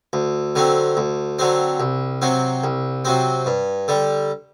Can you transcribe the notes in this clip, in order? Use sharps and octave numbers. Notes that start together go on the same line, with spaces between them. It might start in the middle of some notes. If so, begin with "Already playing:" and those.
D2
D3 F#3 C4
D2
D3 F#3 C4
C2
C3 F#3 C4
C2
C3 F#3 C4
G2
D3 G3